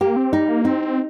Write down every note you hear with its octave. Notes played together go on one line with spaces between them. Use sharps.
A#3 G4
C4
G3 D#4
A#3
C4 D#4